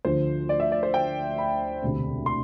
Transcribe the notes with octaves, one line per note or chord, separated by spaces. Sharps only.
D2 D3 F3 C5
D5
E5
D5
C5
G5
B5
E1 D2 C3
C6